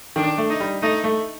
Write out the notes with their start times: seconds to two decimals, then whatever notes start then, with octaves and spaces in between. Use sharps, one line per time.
0.16 D#3 D4
0.38 A3
0.50 D#4
0.60 G3
0.82 A3 D#4
1.04 A3